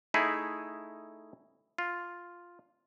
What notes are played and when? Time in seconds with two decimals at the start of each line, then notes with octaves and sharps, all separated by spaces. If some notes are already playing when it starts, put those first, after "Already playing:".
0.14 A3 D#4 E4 G#4
1.78 F4